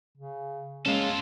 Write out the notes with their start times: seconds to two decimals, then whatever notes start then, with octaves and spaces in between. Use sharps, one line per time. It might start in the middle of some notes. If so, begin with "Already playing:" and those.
0.17 C#3
0.86 G#3 A#3 C#4 F4 A4